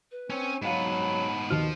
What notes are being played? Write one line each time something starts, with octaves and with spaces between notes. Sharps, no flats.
B4
C4 C#4 C#5
G#2 F#3 B3 F5 B5 E7
D#2 B2 D#3 F3 F6